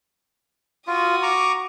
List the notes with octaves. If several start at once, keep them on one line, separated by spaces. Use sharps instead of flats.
F4 F#4 D#6
A#5 C#6 D6